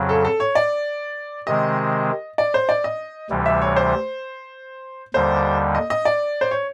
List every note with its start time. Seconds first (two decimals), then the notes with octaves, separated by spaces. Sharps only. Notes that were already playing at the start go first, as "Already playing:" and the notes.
Already playing: F2 C#3 F#3
0.09 A4
0.25 A4
0.40 C#5
0.55 D5
1.47 C3 D#3 G#3 C4 D#5
2.38 D5
2.54 C5
2.69 D5
2.84 D#5
3.30 D2 C3 E3 G3
3.46 E5
3.62 C#5
3.76 C5
5.14 D#2 D3 G3 C5
5.75 D#5
5.90 D#5
6.05 D5
6.41 C5
6.51 C#5